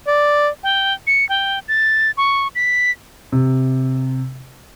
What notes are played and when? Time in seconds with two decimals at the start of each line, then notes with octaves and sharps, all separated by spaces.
0.07 D5
0.63 G5
1.07 C#7
1.29 G5
1.68 A6
2.17 C#6
2.55 B6
3.32 C3